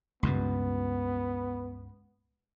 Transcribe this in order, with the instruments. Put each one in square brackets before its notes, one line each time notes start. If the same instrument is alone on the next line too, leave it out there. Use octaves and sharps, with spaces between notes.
[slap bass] C#2 G2 A#2 [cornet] B3